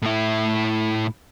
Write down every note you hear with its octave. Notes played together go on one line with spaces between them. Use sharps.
A2 E4